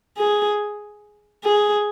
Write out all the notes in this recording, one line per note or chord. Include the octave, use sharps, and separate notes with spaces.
G#4
G#4